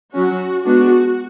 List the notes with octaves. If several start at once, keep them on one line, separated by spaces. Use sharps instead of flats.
F#3 C#4 F#4
G#3 B3 D4 F#4